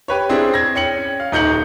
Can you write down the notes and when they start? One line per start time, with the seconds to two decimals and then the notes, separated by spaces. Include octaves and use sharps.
0.08 G4 B4 C#5
0.29 C4 D4 E4 G#4
0.54 G#6 A#6
0.75 C#4 G5 C#7 F#7
1.20 F5
1.32 D#1 D#4 G6 C#7 F#7